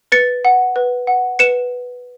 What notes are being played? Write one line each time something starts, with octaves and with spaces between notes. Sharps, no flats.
B4 A6 C#7
F#5
B4
F#5
B4 C#7 E7